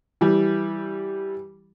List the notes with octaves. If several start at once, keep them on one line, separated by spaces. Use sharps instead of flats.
E3 G3